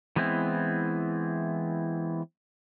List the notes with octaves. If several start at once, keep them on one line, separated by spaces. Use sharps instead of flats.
E3 G#3 B3 C4 E4